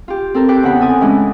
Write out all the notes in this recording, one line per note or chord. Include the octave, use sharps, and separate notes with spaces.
F4 G4
C4 A4 A#4
G4 B4 C5 G5 D6 F#6
E2 C#3 B3 F#5 B5
C4 A4 B4 G#5 D#6
A2 E3 G#3 C#4 D4